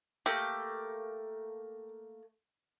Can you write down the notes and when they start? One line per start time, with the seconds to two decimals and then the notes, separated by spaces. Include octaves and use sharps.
0.26 A3 A#3 G4